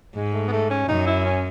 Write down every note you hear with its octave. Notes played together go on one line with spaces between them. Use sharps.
G#2 G#3
A3
B3
A3
C#4
F#2 D#4
E4
C#4